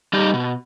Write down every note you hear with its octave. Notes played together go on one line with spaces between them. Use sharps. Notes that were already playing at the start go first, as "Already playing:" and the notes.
G3 D#4 G4
B2